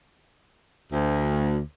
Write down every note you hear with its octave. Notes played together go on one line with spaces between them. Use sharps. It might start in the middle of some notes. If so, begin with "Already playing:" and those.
D2